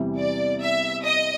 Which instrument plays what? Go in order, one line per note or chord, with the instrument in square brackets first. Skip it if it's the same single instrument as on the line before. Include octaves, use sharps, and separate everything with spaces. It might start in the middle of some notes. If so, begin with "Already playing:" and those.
Already playing: [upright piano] E2 C3 E3 G3
[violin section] D5
E5
D#5